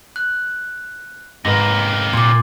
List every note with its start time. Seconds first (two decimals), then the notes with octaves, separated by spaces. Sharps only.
0.16 F#6
1.45 G#2 C3 A#3 B4 A#6
2.13 A#2 C6 D6